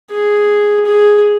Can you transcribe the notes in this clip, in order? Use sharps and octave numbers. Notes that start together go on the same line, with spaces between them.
G#4
G#4